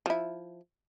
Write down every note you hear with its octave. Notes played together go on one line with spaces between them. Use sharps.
F3 E4